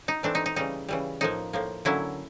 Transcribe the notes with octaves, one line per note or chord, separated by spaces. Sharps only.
D#4
E3 A3 C4 D4
D#4
D#4
C#3 E3 G3 D#4
C#3 E3 G3
A2 F3 A#3 D#4
A2 F3 A#3
D3 F#3 A#3 C#4 E4